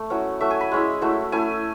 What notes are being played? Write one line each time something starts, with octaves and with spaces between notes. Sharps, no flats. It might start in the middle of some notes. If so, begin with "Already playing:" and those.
Already playing: A3
F#3 C#4 E4
F#3 A3 E4 E5
G#5
B5
G#3 C#4 E4
F#3 A3 E4
A3 C#4 E4 G#5